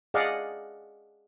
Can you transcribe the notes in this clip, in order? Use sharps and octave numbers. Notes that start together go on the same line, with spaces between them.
G#4 D5 D#5 F5 F#5